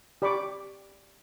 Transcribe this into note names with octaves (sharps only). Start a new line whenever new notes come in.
G4 D5 B5 C#6 D6